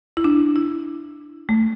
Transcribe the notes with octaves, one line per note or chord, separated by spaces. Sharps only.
E4
D4
E4
A3